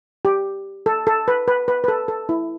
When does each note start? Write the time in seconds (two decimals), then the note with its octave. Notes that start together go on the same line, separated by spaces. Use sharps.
0.25 G4
0.86 A4
1.07 A4
1.28 B4
1.48 B4
1.68 B4
1.84 B4
1.88 A4
2.08 A4
2.29 E4